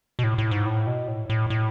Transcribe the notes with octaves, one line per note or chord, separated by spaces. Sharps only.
B2
A2
A2
G#2
A2
B2
A2
A2
A2